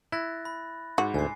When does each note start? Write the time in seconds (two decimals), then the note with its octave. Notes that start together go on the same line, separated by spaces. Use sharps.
0.12 E4 F#6 A6 A#6
0.45 B5
0.98 G#2 F#4
1.14 D2 G#5 C7